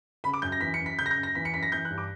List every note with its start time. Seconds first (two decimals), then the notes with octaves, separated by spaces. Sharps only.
0.24 C#3 B5
0.33 D6
0.42 F#2 G6
0.52 A#6
0.61 E3 B6
0.74 C#7
0.80 F#2
0.86 B6
0.98 C#3 G6
1.06 A#6
1.11 G6
1.17 F#2
1.23 A#6
1.35 E3 B6
1.45 C#7
1.54 F#2 B6
1.63 A#6
1.72 E3 G6
1.85 F#6
1.90 G2
1.98 D6